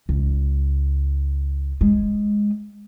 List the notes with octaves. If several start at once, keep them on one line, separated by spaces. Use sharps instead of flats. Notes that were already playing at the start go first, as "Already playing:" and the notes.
C#2
G#3